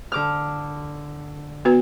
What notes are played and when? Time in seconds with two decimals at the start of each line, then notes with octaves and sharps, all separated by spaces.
0.12 D3 D6 F6
1.65 B3 F#4 B4